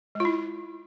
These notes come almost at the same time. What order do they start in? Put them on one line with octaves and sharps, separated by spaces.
G#3 F4 E4